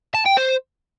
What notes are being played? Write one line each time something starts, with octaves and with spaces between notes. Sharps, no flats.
A5
G5
C5